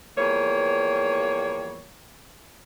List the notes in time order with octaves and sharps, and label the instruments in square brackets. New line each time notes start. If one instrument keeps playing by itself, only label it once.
[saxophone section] E2 F3 G3 A#3 C#5